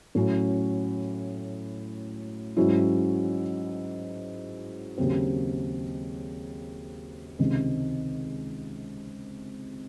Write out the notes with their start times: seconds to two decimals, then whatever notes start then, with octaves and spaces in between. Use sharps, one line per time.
0.15 A2 F#3 C#4
2.57 G#2 F#3 C#4 E4
4.98 D#2 C#3 F#3 C4
7.39 C#2 C3 D#3